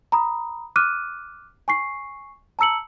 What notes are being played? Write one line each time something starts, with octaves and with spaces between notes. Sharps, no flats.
A#5 B5 D#6
D6 F6 F#6 D#7
G#5 C#6 C7
A5 A#5 E6 C#7 F#7